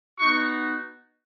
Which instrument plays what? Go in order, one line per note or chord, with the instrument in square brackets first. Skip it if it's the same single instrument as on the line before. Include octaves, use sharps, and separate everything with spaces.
[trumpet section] B3 D#4 F#4 C#6